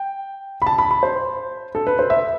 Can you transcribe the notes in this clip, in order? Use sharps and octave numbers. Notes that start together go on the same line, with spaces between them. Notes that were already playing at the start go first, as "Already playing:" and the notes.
Already playing: G5
B5
A5
B5
B5
C5
A4
B4
C5
E5